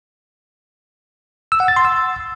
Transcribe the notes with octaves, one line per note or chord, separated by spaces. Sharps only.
E6
F#5
A6
C6
E6